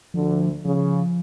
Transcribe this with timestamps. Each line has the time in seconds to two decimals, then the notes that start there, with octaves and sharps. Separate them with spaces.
0.14 D2 D3 F3
0.65 C#3 F3